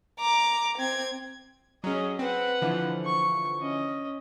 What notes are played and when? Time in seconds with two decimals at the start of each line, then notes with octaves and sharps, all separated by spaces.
0.20 A#5 D6
0.78 C4 G#6
1.84 F#3 C#4 G#4 D#5
2.19 C4 B4 F#5
2.62 D3 E3 F3
3.05 C#6
3.61 C#4 D#5